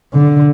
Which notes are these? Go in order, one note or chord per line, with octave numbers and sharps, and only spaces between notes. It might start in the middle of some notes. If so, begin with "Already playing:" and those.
D3